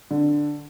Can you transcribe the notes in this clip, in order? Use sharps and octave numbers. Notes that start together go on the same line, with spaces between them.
D3